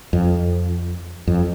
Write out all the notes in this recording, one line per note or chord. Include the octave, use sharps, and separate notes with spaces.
F2
F2